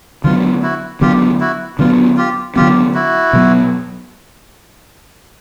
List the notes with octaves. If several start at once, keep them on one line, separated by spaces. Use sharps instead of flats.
D3 F#3 B3 F4
E4 F#4
D3 F#3 B3 F4 G4
E4 F#4
D3 F#3 B3 F4
F4 G4
D3 F#3 B3 F4 G4
E4 F#4
B2 F#3 B3